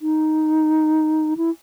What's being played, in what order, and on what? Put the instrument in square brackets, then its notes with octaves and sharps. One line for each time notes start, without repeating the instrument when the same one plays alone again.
[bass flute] D#4
E4